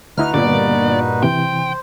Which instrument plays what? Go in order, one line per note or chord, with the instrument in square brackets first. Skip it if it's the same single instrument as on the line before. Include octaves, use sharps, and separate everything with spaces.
[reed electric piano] D2 E4 D#5 [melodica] D#4 F#4 B4 [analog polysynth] F6
[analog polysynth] G2 A#2 [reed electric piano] D3 B3 [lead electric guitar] D5
[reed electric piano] C3 E3 [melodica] C5 [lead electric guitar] G5